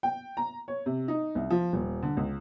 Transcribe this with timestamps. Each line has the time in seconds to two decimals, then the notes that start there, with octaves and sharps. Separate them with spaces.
0.03 G5
0.37 A#5
0.68 C#5
0.86 C3
1.08 D#4
1.35 C2
1.50 F3
1.73 D#1
2.02 D3
2.17 C#2